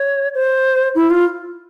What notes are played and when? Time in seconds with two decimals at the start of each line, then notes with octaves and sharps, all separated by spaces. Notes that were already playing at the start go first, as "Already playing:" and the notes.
Already playing: C#5
0.34 C5
0.95 E4
1.10 F4